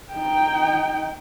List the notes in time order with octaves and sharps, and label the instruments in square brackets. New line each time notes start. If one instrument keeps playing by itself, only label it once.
[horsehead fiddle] D#4 G5